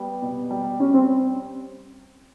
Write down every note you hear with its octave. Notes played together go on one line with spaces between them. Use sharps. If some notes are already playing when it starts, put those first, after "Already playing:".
Already playing: G3 B3
B2
G3
G3 C#4
C4